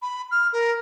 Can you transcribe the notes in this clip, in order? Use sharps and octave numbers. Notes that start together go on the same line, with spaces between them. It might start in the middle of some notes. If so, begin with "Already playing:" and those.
B5
F6
A#4